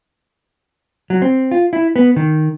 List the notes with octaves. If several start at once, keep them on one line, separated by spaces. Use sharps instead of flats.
F#3
C4
F4
E4
B3
D#3